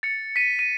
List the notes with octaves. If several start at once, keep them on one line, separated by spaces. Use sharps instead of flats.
A6 C#7
B6 D#7
D#7